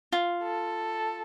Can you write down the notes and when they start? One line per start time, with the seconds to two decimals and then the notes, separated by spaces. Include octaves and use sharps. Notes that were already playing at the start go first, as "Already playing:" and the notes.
0.12 F4
0.42 A4